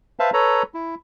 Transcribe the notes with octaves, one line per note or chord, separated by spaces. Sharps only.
B4 C5 E5 F5 A5
A4 B4 C#5 A#5
E4